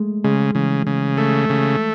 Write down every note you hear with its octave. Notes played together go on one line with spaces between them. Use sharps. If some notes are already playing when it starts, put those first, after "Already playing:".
Already playing: G#3 A3
C#3 G#3
C#3 E3
C#3
A3
C#3